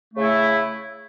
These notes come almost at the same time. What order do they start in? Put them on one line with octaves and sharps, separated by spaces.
A3 C#3 E4